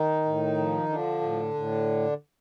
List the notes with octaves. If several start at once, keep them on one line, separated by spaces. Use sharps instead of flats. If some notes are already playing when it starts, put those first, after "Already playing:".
Already playing: D#3 D#4
A2
F3
D3 F3 D4
A2
A2